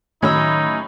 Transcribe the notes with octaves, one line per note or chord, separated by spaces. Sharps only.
A2 D#3 F#3 C#4 D#4 E6 G#6